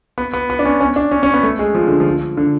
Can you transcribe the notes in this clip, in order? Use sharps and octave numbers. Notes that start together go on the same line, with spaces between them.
B3
B3
B3
D4
C#4
C#4
D4
C#4
C#4
B3
A3
G#3
F3
D3
F3
D3